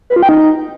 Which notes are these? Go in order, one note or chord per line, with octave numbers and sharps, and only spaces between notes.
B4
F4
G5
D#4